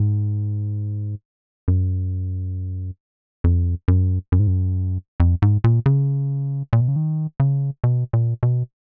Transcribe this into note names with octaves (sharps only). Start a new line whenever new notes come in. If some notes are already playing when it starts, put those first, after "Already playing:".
Already playing: G#2
F#2
F2
F#2
F#2
G#2
F#2
F2
G#2
A#2
C#3
A#2
B2
C#3
D#3
C#3
B2
A#2
B2